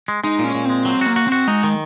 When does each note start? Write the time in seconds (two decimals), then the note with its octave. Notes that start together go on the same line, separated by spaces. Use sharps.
0.08 G#3
0.24 G#3 D#4
0.39 A#2 C#4
0.55 A#2
0.65 G#3 C4
0.85 F#3 C4
1.01 A#3 F#4
1.16 F#4
1.27 C4 F#4
1.47 G#3 D#4
1.63 D#3